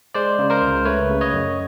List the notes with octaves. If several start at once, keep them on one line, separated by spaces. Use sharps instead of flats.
G#3 C5 D5
C#3
A#4 C5
C#2
A3 B4 C#5
C#3
C#5 D#5
F#2